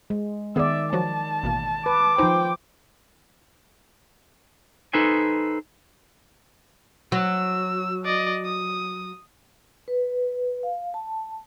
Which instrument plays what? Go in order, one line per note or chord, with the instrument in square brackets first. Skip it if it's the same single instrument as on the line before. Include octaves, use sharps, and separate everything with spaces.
[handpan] G#3
[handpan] D#3 D5 [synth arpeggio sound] B3 G#4 [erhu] E5
[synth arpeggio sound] F3 F#3 F#4 [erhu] A5
[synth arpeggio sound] A1 B2 A#3
[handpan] B4 [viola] D6
[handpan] F3 C5 [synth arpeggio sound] D#4 G#5 A#5 [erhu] G5
[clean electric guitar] D#4 A4 B4 C5 G#5
[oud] F#3 [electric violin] E6
[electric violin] D5 D#5
D#6
[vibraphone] B4
F5
A5